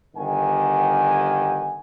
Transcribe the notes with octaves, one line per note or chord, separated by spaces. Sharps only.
G1 D#3 G4 F#5 G#5